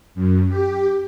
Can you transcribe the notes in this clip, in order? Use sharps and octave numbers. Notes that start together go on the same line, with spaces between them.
F#2
G4